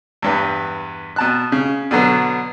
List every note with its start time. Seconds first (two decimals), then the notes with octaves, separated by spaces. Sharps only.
0.22 E2 G2 B4
1.16 B2 A5 F#6
1.52 C#3
1.91 B2 D3 F#3 B3